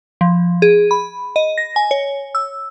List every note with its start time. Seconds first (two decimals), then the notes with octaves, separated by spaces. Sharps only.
0.21 F3
0.62 G#4
0.91 B5
1.36 D#5
1.58 A#6
1.76 G#5
1.91 C#5
2.35 E6